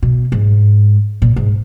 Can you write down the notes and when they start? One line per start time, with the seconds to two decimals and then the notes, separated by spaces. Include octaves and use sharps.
0.03 B2
0.32 G#2
1.22 A#2
1.36 G#2